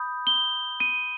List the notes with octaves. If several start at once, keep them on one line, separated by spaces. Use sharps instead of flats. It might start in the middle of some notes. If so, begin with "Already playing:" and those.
Already playing: B5 D#6 G6
G7
D#7